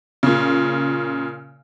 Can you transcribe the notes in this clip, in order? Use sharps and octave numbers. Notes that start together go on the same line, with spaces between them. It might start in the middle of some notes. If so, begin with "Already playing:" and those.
A#2 C#3